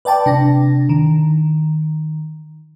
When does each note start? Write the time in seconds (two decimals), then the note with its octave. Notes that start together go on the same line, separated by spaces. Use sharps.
0.05 B4 D5 G5 A5 D6
0.26 C3 D4 A#6
0.89 D#3